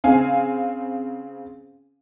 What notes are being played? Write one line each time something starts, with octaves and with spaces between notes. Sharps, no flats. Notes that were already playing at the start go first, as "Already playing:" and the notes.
C#3 C4 F5 G#5